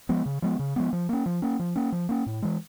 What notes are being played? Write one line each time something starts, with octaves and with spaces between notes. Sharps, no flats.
F3 G#3 B3
C#3
F3 G#3 B3
C#3
F3 G#3 B3
F3
A#3 C#4
F3
A#3 C#4
F3
A#3 C#4
F3
A#3 C#4
A2
E3 G#3